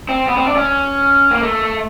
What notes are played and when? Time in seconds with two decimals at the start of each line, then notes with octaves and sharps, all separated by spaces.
0.09 C4
0.28 B3
0.37 C4
0.47 D4
0.56 C#4
1.31 A#3
1.43 A3